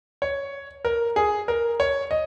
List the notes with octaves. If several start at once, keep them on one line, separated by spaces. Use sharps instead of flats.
C#5
A#4
G#4
A#4
C#5
D#5